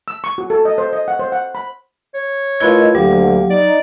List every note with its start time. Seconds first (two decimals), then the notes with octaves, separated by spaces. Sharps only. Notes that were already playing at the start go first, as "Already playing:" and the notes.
0.08 E6
0.24 C#6
0.38 F#4
0.50 A4
0.65 D#5
0.78 C5
0.93 D#5
1.08 F#5
1.19 C5
1.32 F#5
1.55 B5
2.14 C#5
2.60 A3 E4 F4 A#4 B4 D#5 G#6
2.95 D2 F#3 A#3 G4
3.50 D#4 D5